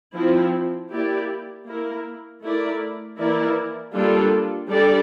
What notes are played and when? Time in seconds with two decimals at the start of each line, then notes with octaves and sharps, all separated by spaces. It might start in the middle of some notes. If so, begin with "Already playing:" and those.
0.15 F3 C4 E4
0.91 A#3 E4 G4 D5
1.67 A#3 E4 A#4
2.43 A3 E4 A#4 D5
3.18 E3 A#3 E4 A#4 D5
3.93 G3 A#3 D4 F4 A4
4.69 G3 D4 A4 D5